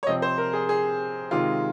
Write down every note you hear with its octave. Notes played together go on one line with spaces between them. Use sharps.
C#5
C3 F3 C4 D#5
C5
A#4
G#4
G#4
C3 D#3 G#3 F4